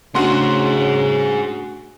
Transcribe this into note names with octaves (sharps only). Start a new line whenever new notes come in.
C#3 A3 D4 F#4 G#4 C5 C6